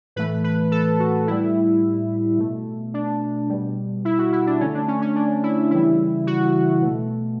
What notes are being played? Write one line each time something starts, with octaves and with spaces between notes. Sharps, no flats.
A2 E3 A3 B4
B4
A4
F#4
A2 G3 E4
B2 A3
D4
B2 G3
E4
F#4
E4
D4
D3 A3 C#4
D4
C#4
C#4
D4
E4
C#3 E3 G3 E4
F#4
B2 A3